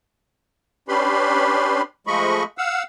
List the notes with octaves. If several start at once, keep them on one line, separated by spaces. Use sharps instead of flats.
C#4 D4 G4 B4 B5 C6
F3 G#3 A3 D#5 B5 C#6
F5 F#5 E6